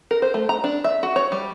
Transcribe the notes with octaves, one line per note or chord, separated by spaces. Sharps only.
A#4
C5
A3
A#5
D4
E5
F#4
C#5
G3